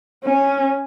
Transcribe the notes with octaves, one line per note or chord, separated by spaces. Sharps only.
C#4